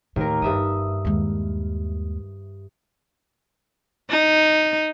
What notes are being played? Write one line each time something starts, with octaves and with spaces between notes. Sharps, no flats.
D#2 A2 A#4
G1 G2 E5 D#6
D#2 G#3
D#4